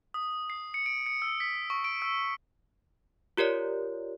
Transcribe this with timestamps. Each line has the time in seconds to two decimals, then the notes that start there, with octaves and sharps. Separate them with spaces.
0.14 D#6
0.50 C7
0.74 C#7
0.86 D7
1.06 C#7
1.22 E6
1.40 B6
1.70 C#6
1.84 D7
2.02 E6
3.37 F4 G4 A#4 C#5 D5